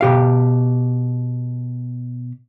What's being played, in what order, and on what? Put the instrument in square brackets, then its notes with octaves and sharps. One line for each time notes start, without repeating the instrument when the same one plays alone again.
[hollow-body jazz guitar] B2 G4 F5